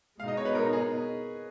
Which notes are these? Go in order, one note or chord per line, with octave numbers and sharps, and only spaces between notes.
B2 G#3 D#4 F5
D#5
C#5
B4
A#4
G#4